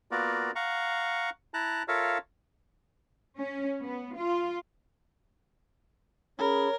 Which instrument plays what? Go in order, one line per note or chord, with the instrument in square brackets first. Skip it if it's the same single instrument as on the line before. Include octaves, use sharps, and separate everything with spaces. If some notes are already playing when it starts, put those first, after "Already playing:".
[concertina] A#3 B3 F4 F#4 A#4 D5
F5 F#5 A#5 C#6
E4 A5 A#5 F#6
F4 A4 A#4 C#5 E5 F5
[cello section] C#4
B3
F4
[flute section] C#4 G#4 B5 [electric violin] A#4 [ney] C#5